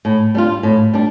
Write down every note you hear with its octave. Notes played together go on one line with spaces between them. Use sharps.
A2
G3 D4 F4
A2
G3 D4